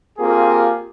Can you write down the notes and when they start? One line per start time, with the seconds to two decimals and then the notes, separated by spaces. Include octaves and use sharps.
0.19 A#3 C4 F4 G4 G#4